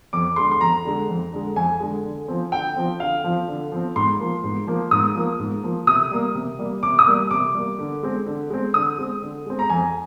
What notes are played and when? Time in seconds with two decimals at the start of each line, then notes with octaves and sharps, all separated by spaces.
0.13 F2 D6
0.36 D3 G#3 C6
0.51 C6
0.61 F2 A#5
0.85 D3 G#3
1.09 F2
1.32 D3 G#3
1.56 F2 G#5
1.80 D3 G#3
2.04 D3
2.28 F3 C4
2.52 D3 G5
2.76 F3 C4
3.00 D3 F5
3.24 F3 C4
3.48 D3
3.72 F3 C4
3.96 G#2 C6
4.19 F3 A#3
4.44 G#2
4.67 F3 A#3
4.91 G#2 D#6
5.15 F3 A#3
5.39 G#2
5.63 F3 A#3
5.87 C3 D#6
6.11 G3 A#3
6.35 C3
6.59 G3 A#3
6.83 C3 D6
6.99 D#6
7.07 G3 A#3
7.31 C3 D6
7.54 G3 A#3
7.79 D3
8.03 G#3 C4
8.26 D3
8.50 G#3 C4
8.74 D3 D#6
8.98 G#3 C4
9.22 D3
9.46 G#3 C4
9.59 A#5
9.70 F2 G#5